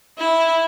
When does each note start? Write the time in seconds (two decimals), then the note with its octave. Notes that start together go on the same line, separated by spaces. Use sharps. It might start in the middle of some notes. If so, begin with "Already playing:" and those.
0.18 E4